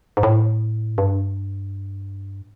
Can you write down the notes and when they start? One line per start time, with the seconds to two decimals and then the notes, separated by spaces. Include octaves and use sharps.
0.17 G#2
0.23 A2
0.98 G2